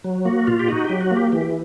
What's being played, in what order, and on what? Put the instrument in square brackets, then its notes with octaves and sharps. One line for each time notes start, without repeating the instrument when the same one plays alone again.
[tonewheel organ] F#3
A#3 F#4
A#2 F4
G4
D#4 F#4
F#3 G4
F#4
A#3
G4
E3 G4